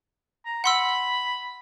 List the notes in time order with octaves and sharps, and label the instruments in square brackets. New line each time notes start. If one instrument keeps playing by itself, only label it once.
[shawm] A#5
[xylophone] F#5 C6 E6 [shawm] B5